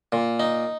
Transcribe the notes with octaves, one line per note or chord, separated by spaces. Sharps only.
A#2
D#4